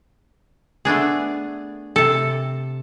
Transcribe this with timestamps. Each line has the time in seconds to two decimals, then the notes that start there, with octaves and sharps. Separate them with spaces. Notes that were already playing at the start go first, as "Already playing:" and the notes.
0.85 A3 B3 D4 G#4
1.96 C3 A4